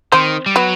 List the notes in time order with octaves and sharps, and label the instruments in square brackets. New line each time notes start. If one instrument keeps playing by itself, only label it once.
[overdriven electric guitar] D#3 [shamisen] C4 C5
[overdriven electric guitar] G3
[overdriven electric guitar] F#3 [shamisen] B3 B4